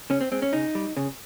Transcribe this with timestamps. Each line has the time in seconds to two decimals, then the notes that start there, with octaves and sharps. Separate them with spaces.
0.10 C#3 C#4
0.21 C4
0.32 G#3 C4
0.42 C#4
0.53 C#3 D#4
0.75 G3
0.97 C#3